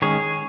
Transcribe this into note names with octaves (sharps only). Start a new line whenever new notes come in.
D#3 G#3 C#4 G#4 C#5